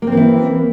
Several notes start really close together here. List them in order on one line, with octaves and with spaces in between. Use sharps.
A#3 C4 E3 E4